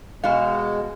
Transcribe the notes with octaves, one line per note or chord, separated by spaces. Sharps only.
B2 G#3 F#4 F5